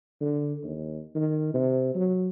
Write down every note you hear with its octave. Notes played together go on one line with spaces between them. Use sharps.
D3
D#2
D#3
C3
F#3